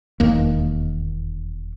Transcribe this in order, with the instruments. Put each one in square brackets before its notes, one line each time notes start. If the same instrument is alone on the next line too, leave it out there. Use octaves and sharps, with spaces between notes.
[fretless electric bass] E1 D#2 D#3 A#3